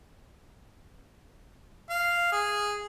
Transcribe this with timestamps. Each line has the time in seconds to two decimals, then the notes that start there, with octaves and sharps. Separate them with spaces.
1.90 F5
2.32 G#4